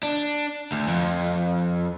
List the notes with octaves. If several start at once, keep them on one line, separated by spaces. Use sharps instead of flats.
D4
D2
F2